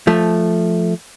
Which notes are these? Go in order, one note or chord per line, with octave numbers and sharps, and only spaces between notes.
F3 A3